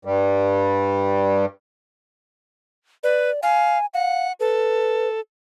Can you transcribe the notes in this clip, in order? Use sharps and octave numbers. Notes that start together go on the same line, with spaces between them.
G2 G3
B4 D5
F5 G#5
F5 F#5
A4 B4